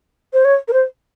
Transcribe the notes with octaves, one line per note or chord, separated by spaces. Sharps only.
C5
C#5
A#4
C5